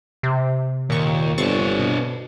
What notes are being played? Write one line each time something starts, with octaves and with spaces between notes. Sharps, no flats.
C3
D#2 A#2 C#6
G1 C4 D4 C#6 A6
B2